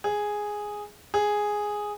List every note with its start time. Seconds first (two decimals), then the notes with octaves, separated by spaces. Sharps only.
0.04 G#4
1.14 G#4